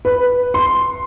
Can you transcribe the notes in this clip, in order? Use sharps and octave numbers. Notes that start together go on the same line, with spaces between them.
B4
C6